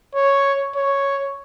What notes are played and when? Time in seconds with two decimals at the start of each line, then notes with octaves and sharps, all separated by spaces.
0.15 C#5
0.76 C#5